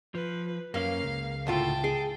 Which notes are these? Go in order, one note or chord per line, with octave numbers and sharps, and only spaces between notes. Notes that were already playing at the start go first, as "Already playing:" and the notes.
F3 B4
F#2 A#3 C#4 F5
C#2
D2 A2 F4 G5 A5
G#4